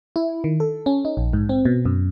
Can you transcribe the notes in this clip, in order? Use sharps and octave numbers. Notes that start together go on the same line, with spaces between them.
E4
D#3
A4
C#4
D#4
A#1
G#2
C4
B2
F#2